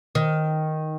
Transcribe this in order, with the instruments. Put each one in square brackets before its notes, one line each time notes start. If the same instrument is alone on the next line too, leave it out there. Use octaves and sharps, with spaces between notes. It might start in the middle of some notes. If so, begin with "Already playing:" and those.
[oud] D#3